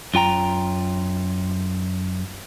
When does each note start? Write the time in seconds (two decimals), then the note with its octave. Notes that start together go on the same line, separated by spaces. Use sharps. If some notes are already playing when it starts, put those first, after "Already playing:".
0.14 F#2 F4 G5 A#5